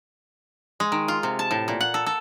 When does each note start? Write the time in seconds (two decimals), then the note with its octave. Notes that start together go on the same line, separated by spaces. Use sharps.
0.80 G#3
0.92 D#3
1.08 F4
1.23 C3
1.39 A5
1.51 A2
1.68 A#2
1.81 F#5
1.94 A4
2.06 A4